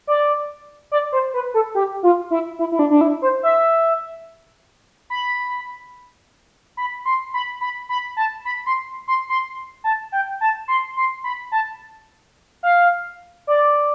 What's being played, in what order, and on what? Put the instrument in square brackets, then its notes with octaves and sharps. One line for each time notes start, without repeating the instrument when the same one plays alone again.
[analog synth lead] D5
D5
C5
B4
A4
G4
F4
E4
E4
E4
D4
D4
E4
C5
E5
B5
B5
C6
B5
B5
B5
A5
B5
C6
C6
C6
A5
G5
A5
C6
C6
B5
A5
F5
D5